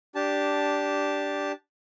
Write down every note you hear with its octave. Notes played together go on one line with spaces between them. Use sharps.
D4 G4 A5